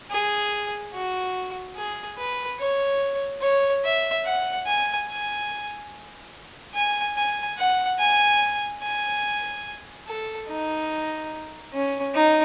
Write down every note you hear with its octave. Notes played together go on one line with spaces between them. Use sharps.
G#4
F#4
G#4
B4
C#5
C#5
E5
F#5
G#5
G#5
G#5
G#5
F#5
G#5
G#5
A4
D#4
C#4
D#4